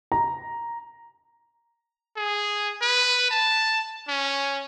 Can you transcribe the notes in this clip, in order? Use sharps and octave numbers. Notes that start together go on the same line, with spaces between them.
A#5
G#4
B4
A5
C#4